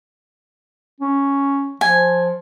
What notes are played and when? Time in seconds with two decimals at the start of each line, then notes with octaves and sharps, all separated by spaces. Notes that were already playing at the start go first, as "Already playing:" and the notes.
1.00 C#4
1.81 F3 G#5